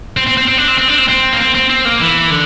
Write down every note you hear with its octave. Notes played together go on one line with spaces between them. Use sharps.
C4
C4
C4
C4
D4
C4
C4
D4
C4
C4
A#3
C4
C4
C4
A#3
E3
D3